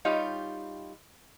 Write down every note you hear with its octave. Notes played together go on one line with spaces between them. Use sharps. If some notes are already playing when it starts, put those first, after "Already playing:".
G3 D#4 F4 G4 C#5